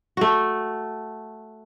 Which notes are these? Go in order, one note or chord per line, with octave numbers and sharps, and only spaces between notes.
A3 F#4